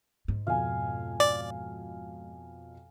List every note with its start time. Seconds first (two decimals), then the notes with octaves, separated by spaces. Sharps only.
0.28 G#2
0.47 F2 B2 F5 G#5
1.20 D5